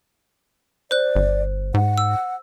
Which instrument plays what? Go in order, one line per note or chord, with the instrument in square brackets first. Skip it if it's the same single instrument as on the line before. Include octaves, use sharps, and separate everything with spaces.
[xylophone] C5 F#6 [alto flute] D5
[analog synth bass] G1
[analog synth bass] G#2 [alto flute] F#5
[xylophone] E6